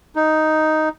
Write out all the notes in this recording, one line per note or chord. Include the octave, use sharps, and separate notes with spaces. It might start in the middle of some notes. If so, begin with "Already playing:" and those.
D#4